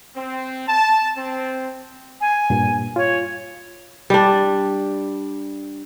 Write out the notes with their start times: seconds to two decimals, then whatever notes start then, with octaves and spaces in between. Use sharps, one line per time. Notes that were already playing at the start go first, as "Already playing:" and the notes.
0.16 C4
0.68 A5
1.17 C4
2.20 G#5
2.50 G2 A#2
2.96 F4 C#5
4.10 G3 D4